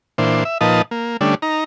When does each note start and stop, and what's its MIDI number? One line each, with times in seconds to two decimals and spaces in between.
0.18 0.44 46
0.18 0.44 52
0.18 0.44 62
0.18 0.44 72
0.45 0.58 76
0.61 0.82 46
0.61 0.82 53
0.61 0.82 63
0.61 0.82 71
0.61 0.82 75
0.61 0.82 81
0.91 1.17 58
1.21 1.35 50
1.21 1.35 55
1.21 1.35 57
1.21 1.35 61
1.21 1.35 62
1.42 1.64 63
1.42 1.64 82